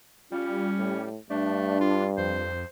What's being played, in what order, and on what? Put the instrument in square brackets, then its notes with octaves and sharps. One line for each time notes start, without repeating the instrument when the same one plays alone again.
[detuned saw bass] G3 [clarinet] C#4 [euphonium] F4
[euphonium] A2
[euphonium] G2 [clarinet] A3 [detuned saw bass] D4
[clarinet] F4
[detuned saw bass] F2 [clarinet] C5